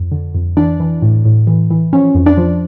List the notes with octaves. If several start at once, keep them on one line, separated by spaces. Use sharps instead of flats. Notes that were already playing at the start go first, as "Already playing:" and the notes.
Already playing: F2
D3
F2
E3 D4
E3
A2
A2
E3
E3
F3 C#4
F2
D4
F3